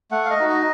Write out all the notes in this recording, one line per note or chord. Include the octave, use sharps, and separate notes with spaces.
A3 F#5
F5
D#5
D#4 F#4
D#5